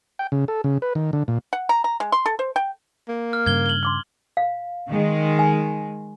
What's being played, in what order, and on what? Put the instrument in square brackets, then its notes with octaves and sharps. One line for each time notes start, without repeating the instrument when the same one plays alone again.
[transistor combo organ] G5
C#3
A4
C#3
B4
D#3
D3
A#2
[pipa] F#5
A#5
A#5
G#3
C6
A4
C5
G5
[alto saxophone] A#3
[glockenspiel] F6
[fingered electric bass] G2 C#3 [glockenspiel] G#6 G7
[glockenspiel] F#7 G7
[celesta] C6 D6 F6
[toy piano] F5
[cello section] D#3 G#3
[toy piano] G#5